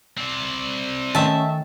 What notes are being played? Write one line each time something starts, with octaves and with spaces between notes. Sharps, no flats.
C4 D5
D#3 A3 C#4 D#5 E5 A5